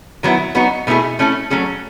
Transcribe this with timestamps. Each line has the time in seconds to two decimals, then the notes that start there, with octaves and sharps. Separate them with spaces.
0.23 D#3 F#3 B3 E4
0.55 F#3 B3 D#4 F#4
0.87 B2 A3 E4 G#4
1.19 A3 C#4 E4 A4
1.50 F#3 A3 C#4 G#4